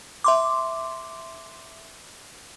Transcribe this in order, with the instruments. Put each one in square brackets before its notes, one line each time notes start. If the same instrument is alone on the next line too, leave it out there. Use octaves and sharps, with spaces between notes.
[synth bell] E5 C6 D6